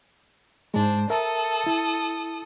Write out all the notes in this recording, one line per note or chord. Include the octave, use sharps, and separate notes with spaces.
G#2 G#3 D4 C5
A4 A#4 E5 A5 D#6
E4